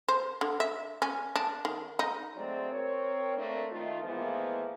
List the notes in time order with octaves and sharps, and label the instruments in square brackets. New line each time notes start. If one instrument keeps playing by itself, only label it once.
[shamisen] C5
D3
E5
C#4
D4
D#3
D#4
[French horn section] D2 F#3 G#3 A3 C4 D5
C4 A#4 C#5
A3 A#3 C4 D4
D#3 A3 F4
A2 E3 F3 G#3 A#3 B3